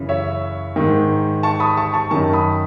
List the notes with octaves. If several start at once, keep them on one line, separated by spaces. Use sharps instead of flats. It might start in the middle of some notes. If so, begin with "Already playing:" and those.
Already playing: F#2 C#3 E3
C#5 E5
G#2 D#3
A5 C#6
B5 D#6
A5 C#6
A5 C#6
F#2 D#3 A5 C#6
B5 D#6